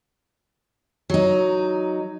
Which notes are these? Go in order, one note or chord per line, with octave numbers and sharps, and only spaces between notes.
F#3 D#4